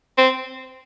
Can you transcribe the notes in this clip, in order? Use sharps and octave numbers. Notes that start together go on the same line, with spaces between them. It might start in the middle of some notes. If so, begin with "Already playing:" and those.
C4